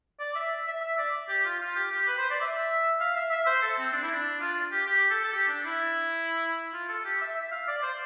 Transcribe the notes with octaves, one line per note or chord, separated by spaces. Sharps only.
D5
E5
E5
E5
D5
G4
F4
F4
G4
G4
B4
C5
D5
E5
F5
E5
E5
C5
A4
C4
D4
E4
D4
F4
G4
G4
A4
A4
G4
D4
E4
F4
A4
G4
E5
E5
F5
D5
C5